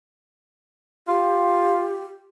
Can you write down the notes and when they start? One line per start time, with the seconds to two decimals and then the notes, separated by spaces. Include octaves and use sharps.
1.08 F4 G4